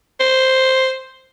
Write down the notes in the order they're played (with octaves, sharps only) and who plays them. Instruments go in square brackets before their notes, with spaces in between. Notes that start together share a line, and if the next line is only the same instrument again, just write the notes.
[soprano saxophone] C5